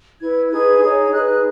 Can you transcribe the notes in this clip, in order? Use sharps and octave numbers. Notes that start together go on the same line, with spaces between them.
E4 B4 G#6
D#4 G#4 B4 G#6
D#4 G#4 C#5
G#6
D#4 G#4 B4 F#6
F#6